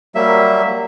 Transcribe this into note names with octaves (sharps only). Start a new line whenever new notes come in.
F#3 G3 A#3 E5